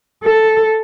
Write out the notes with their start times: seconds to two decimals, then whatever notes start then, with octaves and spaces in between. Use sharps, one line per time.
0.23 A4